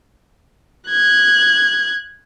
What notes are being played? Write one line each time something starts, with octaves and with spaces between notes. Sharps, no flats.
F#6 G#6